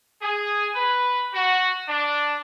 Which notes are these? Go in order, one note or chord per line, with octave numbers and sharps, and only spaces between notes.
G#4
B4
F#4
D4